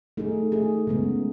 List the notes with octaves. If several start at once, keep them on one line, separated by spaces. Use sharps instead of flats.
A3 D#4 G#4
A3 D#4 G#4
C#3 G#3 B3